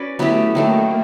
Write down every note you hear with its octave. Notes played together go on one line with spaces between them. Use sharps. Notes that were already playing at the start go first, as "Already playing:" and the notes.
Already playing: C#4 F#4 B4 D5
F#3 A3 B3 E4 G4
D#3 F#3 A3 A#3